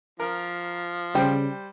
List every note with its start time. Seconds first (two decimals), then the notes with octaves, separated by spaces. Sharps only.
0.20 F3 A#4
1.15 C#3 G3 C5 G5